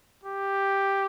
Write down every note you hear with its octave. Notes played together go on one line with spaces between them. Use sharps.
G4